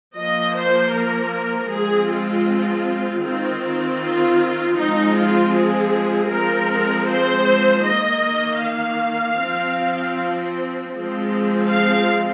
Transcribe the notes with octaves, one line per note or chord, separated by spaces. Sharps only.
F3 A#3 D#5
C5
A#4
F3 G#3 C4 G#4
F4
D#3 C4 F4
F4
F3 G#3 C4 D#4
F4
G#4
F3 G#3 C4 A#4
C5
D#3 A#3 D#5
F5
F3 C4
F3 G#3 C4
F5